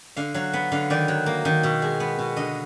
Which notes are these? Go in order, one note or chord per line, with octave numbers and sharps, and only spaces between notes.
D3 F5
F#3 F5
B3
D3 F5
D#3 D5
F#3
A#3
D#3
B2
G#3
B3
B2
D3 D#5